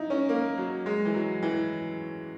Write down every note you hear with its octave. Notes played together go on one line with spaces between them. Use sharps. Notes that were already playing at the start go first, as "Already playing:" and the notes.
Already playing: D#4 E4
C#4
A#3
F#3
G#3
E3
F#3
E3